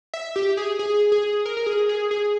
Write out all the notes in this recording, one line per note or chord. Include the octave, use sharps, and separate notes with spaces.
E5
G4
G#4
G#4
G#4
A#4
A#4
G#4
G#4
G#4